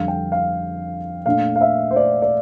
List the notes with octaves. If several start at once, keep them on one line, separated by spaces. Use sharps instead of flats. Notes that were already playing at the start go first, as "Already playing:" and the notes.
Already playing: F2 D3 G3 D4 F5
G5
F5
A#2 A3 D4 F5
F5
E5
C5
D5
D5